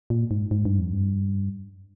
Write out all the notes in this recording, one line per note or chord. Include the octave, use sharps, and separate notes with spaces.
A#2
G#2
G#2
G2
F2
G2